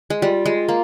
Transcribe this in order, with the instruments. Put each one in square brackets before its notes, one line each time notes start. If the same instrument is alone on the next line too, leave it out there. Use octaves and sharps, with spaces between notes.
[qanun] G#3
[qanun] G3 [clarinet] F4
[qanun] G#3
A#3